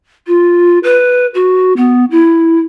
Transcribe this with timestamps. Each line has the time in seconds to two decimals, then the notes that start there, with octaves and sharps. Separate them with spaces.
0.27 F4
0.83 B4
1.34 F#4
1.77 B3
2.11 E4